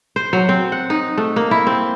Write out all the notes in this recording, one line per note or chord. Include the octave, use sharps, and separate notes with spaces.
C5
F#3
C4
F#5
D#4
A3
A#3
E4
C4